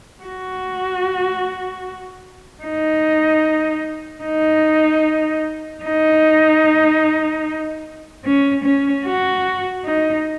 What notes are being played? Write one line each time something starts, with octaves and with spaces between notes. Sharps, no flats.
F#4
D#4
D#4
D#4
C#4
C#4
F#4
D#4